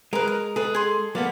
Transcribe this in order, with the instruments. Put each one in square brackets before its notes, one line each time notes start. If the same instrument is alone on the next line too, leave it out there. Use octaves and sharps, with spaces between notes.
[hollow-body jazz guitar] G#3 [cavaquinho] A#4 B4
[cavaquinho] A#4
[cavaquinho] G#4 B4 [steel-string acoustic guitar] A4
[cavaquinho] G#4 C6
[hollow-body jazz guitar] F#3 A#3 B3 [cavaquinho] D5